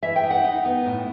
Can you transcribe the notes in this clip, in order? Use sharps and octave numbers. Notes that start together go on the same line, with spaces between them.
E3 E5
G5
D#4
F#5
D#4
B3
A2